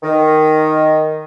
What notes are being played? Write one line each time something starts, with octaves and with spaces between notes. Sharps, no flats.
D#3